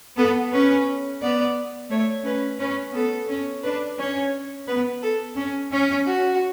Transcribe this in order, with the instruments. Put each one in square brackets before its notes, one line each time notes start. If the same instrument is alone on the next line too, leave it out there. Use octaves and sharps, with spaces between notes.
[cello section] B3 [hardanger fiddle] A4
[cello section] C#4 [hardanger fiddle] B4
[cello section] B3 [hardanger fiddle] D5
[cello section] A3 [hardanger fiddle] C#5
[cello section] C#4 [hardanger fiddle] B4
[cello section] C#4 [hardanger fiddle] B4
[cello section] B3 [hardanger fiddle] A4
[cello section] C#4
[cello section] D4 [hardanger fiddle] B4
[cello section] C#4 [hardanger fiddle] C#5
[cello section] B3 [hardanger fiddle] B4
[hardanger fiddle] A4
[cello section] C#4
C#4
[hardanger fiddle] F#4